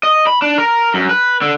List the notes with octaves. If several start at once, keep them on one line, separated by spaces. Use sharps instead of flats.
D#5
B5
D4
A#4
F#2
B4
D3